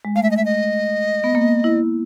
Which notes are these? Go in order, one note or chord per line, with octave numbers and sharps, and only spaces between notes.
G#3
A3 F5
E5
D#5
E5
D#5
B3
A#3
E4